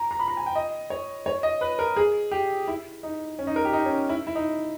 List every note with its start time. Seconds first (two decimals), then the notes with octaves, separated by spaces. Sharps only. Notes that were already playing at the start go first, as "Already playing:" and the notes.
Already playing: A#5
0.11 A#5
0.19 B5
0.28 A#5
0.37 G#5
0.46 G5
0.55 D#5
0.90 C#5
1.26 C#5
1.43 D#5
1.61 B4
1.79 A#4
1.97 G#4
2.31 G4
2.68 E4
3.03 D#4
3.39 C#4
3.47 D#4
3.56 A#4
3.65 G4
3.73 D#4
3.86 C#4
4.09 E4
4.27 E4
4.35 D#4